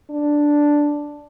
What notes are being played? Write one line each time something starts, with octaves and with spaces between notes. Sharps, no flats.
D4